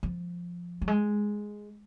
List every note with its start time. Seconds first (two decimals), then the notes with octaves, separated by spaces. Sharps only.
0.03 F3
0.82 F#3
0.88 G#3